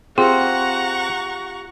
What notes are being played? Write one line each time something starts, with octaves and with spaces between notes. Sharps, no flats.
C4 F4 G4 G#4 F#5 A#5 C#6